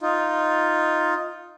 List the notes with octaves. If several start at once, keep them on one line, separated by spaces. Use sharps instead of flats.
D#4 F4